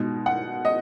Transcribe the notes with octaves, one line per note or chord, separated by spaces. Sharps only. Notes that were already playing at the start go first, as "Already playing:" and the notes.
Already playing: B2 G#3 D#4
F#5
D#5